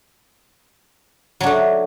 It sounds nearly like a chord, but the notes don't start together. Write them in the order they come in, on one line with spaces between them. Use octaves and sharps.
F#3 D4 A3